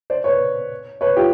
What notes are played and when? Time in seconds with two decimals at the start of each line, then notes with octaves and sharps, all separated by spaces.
0.10 C5 D5
0.24 B4 C#5
1.01 B4 C#5
1.17 F4 G4